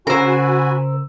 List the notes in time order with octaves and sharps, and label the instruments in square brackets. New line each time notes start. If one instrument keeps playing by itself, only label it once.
[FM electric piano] C#3 E6 [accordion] F#4 G#5 B5 [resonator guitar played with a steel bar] A#4 C5